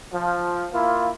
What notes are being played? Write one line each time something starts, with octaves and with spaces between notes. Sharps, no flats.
F3
A#3 E4 F4